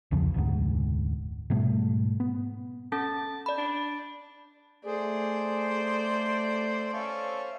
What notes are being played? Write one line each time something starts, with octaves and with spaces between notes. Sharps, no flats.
B1 E2 C#3 F3
F1 D2 G#2 B3
G#2 B2 G3 A3
B3
C#4 A4 A5
D5 B5
D4
A3 G#4 C5 D5
A4
C#4 A4 C5 E5 F5 C#6